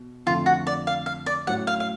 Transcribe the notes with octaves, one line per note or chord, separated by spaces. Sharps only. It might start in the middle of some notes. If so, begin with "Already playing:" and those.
Already playing: B2
F2 D3 F3 A3 F4
F#4
D5
F5
F5
D5
A2 F#3 C#4 F#5
F5
F5